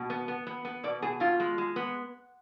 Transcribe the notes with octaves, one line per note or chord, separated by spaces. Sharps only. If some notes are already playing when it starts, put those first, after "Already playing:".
Already playing: B2
B3
B3
B3
B3
B2 D5
B2 G#4
B2 F4
G#3
G#3
B3